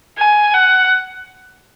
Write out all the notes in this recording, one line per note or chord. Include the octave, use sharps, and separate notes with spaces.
G#5
F#5